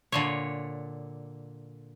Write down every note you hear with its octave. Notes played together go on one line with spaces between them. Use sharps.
A#2 D3 C#5